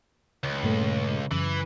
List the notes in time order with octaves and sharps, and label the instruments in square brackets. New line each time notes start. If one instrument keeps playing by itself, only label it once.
[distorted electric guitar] C#2
[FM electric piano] G2 A#2 A3
[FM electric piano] F#2 C#3 [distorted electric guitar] E3